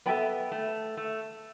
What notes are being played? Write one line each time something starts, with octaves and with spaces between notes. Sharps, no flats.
B3 A4 E5 G5 B5
A3
A3